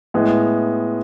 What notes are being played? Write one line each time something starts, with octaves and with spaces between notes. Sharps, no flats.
A2 G#3 B3